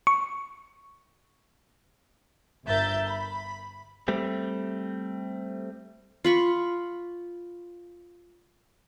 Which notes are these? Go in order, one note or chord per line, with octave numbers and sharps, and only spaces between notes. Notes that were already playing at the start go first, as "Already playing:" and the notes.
C#6
G1 A#4 E5 G6 A6
B5
G3 A3 C4
F4 B5 C#6